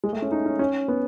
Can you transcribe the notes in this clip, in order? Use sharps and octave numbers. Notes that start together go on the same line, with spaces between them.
G#3
A3
C#4
D#4
C#4
C#4
B3